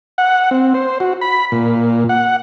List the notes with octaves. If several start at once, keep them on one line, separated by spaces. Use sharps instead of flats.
F#5
C4
C5
F#4
B5
A#2
F#5